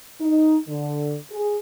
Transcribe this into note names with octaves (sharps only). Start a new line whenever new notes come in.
D#4
D3
G#4